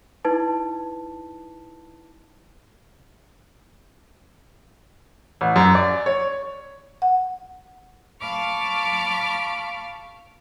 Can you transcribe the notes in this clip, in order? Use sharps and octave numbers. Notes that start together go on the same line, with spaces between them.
D#4 E4 B4 A5
A1
F#2
D5
C#5
F#5
F5 A5 B5 C#6 D6 F6